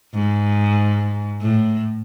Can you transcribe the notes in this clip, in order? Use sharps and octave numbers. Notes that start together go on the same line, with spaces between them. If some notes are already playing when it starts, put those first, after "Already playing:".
G#2
A2